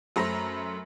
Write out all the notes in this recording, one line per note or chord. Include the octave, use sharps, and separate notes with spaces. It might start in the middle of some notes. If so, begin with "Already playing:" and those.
F#2 A3 C5 A#5 B5 A#6